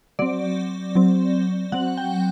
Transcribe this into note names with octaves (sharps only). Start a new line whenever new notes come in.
F#3 C4 D5
F#3 C4
F#3 C4 F#5
G5